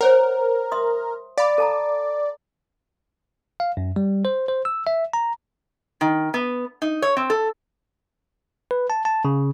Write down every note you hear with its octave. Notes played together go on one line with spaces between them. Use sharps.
A#4 C5 C#5 F#5
E5 C6 D#6
D5 F5 B5
A4 A5 A#5
F5
F#2
G3
C5
C5
E6
E5
A#5
D#3
B3
D#4
C#5
C4
A4
B4
A5
A5
C#3